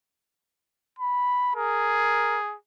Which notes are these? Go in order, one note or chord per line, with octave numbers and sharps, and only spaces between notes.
B5
G#4 A#4